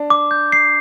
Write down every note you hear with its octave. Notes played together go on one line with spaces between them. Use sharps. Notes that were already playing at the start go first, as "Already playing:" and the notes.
Already playing: D4
D6
G6
C7